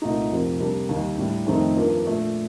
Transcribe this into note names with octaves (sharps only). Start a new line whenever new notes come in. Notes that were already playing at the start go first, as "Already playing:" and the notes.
C2 A#2 A3 D#4
F2 C3 F3 A#3
C3 G3 A#3 D4
D#2 D#3 G3
A2 G3 D4
F2 D#3 A3 C4 D#4
G2 F3 A#3
A#2 A3 D4